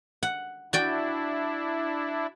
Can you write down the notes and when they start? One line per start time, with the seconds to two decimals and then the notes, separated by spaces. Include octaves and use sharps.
0.23 F#5
0.73 D4 E4 F#4 D5 G5